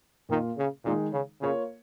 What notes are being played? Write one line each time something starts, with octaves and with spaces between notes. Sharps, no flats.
A#2 D#3 A#3 F4
C#3
A#2 D#3 G#3 D#4 G#4
C#3
C#3 A#3 F4 C#5